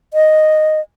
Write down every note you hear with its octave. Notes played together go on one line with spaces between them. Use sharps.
D#5